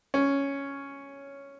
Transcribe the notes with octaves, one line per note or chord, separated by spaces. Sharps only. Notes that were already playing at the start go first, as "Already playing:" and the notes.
C#4